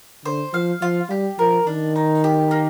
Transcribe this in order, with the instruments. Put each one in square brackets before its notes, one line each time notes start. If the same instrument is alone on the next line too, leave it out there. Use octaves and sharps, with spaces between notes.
[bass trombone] D3 [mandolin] C5
[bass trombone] F3 [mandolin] F5
[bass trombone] F3 [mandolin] F4
[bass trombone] G3 [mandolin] G4
[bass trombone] F3 [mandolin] A#4
[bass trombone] D#3 [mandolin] D4
[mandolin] D#4
G4
A#3